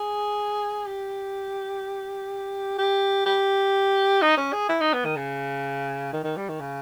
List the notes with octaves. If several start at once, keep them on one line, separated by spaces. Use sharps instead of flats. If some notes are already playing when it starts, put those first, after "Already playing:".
Already playing: G#4
G4
G4
G4
D#4
C#4
G#4
E4
D#4
B3
D#3
C#3
D#3
D#3
G3
D#3
C#3